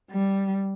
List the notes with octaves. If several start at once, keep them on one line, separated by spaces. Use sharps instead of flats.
G3